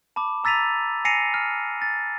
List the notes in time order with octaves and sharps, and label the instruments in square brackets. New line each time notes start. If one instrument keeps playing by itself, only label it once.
[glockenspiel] A5 B5 D6
A#5 E6 A6 B6 D#7 F7
G#5 A#6 C7 C#7 D#7 F7
F6
A6